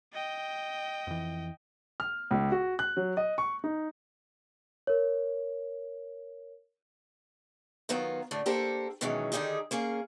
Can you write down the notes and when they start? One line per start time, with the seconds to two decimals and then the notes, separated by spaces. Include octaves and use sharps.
0.13 D#5 G5
1.07 F2 E3
2.00 F6
2.31 C#2
2.52 F#4
2.79 F#6
2.97 F#3
3.17 D#5
3.38 C#6
3.64 D#4
4.87 A#4 C#5
7.89 D#3 F#3 B3 F4
8.31 A2 D3 A3 D4
8.46 A#3 D4 G4 A4 A#4 C5
9.01 B2 D#3 E3 F#3 G#3 C#4
9.32 D3 D#3 D#4 G4 G#4
9.71 A#3 C#4 G#4